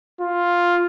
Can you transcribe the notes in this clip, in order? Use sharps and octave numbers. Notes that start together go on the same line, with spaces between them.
F4